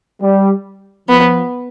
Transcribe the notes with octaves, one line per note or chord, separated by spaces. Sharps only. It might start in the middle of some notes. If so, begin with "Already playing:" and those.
G3
F3 B3